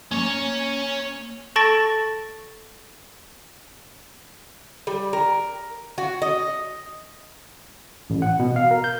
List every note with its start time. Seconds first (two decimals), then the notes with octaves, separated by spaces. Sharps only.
0.11 A#3 C#4 C#5
1.56 A4 A5 C#6 A6 A#6 D7
4.87 G3
5.13 A#4
5.98 F#4
6.22 D#5
8.10 A1
8.22 F#5
8.39 B2
8.56 F5
8.71 A#4
8.84 G6